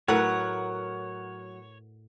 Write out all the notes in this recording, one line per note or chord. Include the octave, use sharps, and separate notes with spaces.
A2 F#3 A#4 B4 C#5 F#5